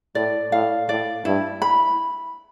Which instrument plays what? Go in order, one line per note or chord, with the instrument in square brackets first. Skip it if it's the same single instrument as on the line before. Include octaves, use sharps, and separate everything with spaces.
[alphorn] A2 [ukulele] D5
[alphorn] A2 [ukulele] F5
[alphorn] A2 [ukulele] D5
[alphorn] G2 [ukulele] E4
[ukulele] B5